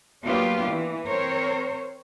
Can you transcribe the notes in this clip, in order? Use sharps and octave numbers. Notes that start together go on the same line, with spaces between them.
F#3 A#3 B3 D4 F4 G4
E3
C4 A#4 C5 C#5